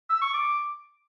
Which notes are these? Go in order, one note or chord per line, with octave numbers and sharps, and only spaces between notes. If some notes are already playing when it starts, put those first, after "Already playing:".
E6
C#6
D6